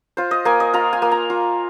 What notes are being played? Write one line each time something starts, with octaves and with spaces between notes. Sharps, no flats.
F4 C5
D#5
A#3 G#5
D#5
F4 A#5
G#5
A#3
A#5
F4